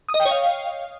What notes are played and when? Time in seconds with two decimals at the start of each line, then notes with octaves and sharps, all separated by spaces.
0.09 D#6
0.14 D#5
0.20 G5
0.25 C#5
0.31 F5